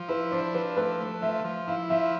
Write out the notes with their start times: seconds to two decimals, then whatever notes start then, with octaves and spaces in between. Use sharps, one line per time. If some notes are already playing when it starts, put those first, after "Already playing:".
Already playing: F3
0.08 E4 B4
0.31 D4 C5
0.54 F3 B4
0.77 A3 B4
1.00 A3
1.22 F3 E5
1.44 F3
1.68 E4 F5
1.90 F3 E5